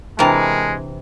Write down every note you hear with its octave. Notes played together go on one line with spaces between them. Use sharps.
C3 E3 G#3 D4 A#4 G5 A5 B5